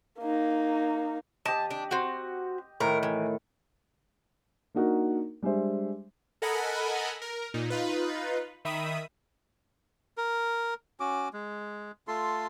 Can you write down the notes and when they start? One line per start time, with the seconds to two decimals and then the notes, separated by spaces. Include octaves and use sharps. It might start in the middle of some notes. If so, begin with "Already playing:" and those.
0.20 A#3 D#4
1.46 G4 D#5 A5
1.71 D4
1.91 C4 F#4
2.80 A2 D#3 A#4
3.03 E3
4.75 A#3 D4 D#4 F#4 A#4
5.42 G3 G#3 D4 C5 E5
6.42 A4 A#4 D#5 F#5 G#5 B5
7.22 A#4
7.54 A#2 D#4
7.70 D#4 F4 B4
8.65 D#3 E5 B5 D#6
10.18 A#4
11.00 C#4 F#4 D6
11.33 G#3
12.08 A3 F4 A4 C6